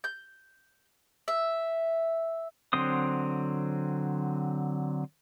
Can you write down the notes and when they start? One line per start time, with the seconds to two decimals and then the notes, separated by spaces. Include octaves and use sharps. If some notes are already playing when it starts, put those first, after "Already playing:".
0.04 G6
1.28 E5
2.73 D3 F#3 C4 C5 D#6